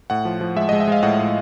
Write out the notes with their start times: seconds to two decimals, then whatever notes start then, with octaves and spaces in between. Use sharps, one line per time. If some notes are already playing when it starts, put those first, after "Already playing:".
0.10 A2 F#5
0.25 F3
0.41 F3
0.56 G#3 E5
0.69 G#3 D#5
0.80 E5
0.88 G#3 F5
1.03 A2 F#5
1.19 A2